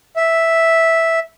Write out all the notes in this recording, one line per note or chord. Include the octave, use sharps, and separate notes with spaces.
E5